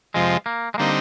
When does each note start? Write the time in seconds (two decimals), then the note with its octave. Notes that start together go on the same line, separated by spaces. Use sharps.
0.14 F2 C3 F3 G#3
0.46 A#3
0.74 G#3
0.78 D3 G3 A#3 C4 D#4